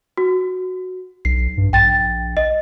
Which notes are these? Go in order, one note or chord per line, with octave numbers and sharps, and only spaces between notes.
F#4
B1 C7
G2
A#1 G5 A6
D#5